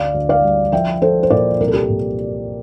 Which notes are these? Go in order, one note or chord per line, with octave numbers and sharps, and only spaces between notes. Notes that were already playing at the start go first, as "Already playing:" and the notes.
Already playing: D2 D5 F5
D2
D5 F5
G3
F3 E5 G5
F3 A4 C5
C5
A#2 A#4 D5
C2 A#4
A4
G4 A#4
A#2